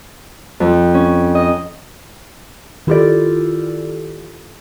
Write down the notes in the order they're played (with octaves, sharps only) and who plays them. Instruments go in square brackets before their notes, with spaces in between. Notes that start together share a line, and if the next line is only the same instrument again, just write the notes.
[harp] F2
C#4
D#5
[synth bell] D#3 E4 F4 G4 A4 D5